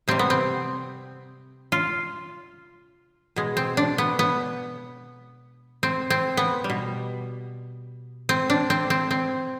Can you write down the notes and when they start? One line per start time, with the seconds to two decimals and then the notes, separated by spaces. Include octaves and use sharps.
0.08 C3 G3 C4
0.19 B3
0.30 C4
1.72 F4
3.36 B2 G#3
3.57 C4
3.77 D4
3.98 B3
4.19 B3
5.83 C4
6.10 C4
6.37 B3
6.64 G3
6.70 B2
8.29 C4
8.50 D4
8.70 C4
8.90 C4
9.11 C4